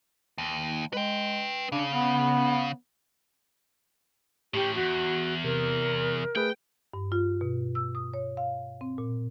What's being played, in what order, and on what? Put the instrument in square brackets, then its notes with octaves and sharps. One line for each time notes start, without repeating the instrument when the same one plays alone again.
[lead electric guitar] D#2
[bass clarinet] G#3 [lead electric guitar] B4 G5
[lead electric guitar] C#3 [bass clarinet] D4
[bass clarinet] B3
[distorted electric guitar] A2 C#4 [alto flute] G4
[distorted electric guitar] E2 [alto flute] F#4
[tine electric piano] C3 [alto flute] A#4
[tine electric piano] A3 G#4 B4 [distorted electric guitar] G5
[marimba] G2
F4
B2
E6
D#6
C#5
F5
C4
A#2